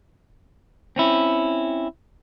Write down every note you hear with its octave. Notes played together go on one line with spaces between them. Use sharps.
C4 C#4 E4